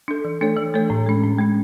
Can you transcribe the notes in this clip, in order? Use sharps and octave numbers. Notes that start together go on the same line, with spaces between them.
D4 A4
E3
A3 D4 A4 C#5
E3
A3 D4 A4 C#5
A2
G#3 C#4
A2
G#3 C#4